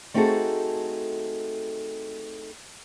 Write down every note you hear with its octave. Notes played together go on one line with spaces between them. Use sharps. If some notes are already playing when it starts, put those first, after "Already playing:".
A3 C4 D#4 F#4 G#4 A4